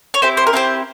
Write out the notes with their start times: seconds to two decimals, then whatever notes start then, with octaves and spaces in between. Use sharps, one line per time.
0.14 C#5
0.22 C4 E4 G4 C5
0.37 C5
0.47 A#4
0.53 C4 E4 G4 C5